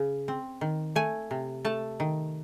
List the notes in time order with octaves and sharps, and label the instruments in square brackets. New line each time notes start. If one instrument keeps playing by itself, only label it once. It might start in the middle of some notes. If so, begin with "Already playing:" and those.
Already playing: [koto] C#3
C4
D#3
A3 G#5
C3
A3 A5
D#3